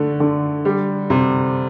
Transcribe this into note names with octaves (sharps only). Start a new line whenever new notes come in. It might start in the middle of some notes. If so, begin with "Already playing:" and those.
Already playing: D3 A3
D3
G3
C3